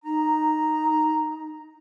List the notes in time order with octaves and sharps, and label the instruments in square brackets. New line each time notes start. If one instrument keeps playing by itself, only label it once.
[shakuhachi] D#4 [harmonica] A#5